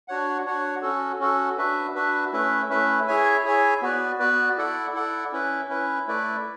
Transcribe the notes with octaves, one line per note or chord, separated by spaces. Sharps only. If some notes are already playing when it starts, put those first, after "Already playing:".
D4 F#4 C#5 F#5
D4 F#4 C#5 F#5
C#4 F#4 A4
C#4 F#4 A4
D4 F#4 B4 E5
D4 F#4 B4 E5
A3 C#4 E4 B4 E5
A3 C#4 E4 B4 E5
E4 G#4 C#5 E5 G#5
E4 G#4 C#5 E5 G#5
B3 F#4 B4 D5
B3 F#4 B4 D5
E4 A4 D5 F#5
E4 A4 D5 F#5
C#4 E4 B4
C#4 E4 B4
A3 E4 B4 D5